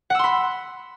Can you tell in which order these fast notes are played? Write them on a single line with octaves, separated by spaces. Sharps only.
F#5 E6 C6 B5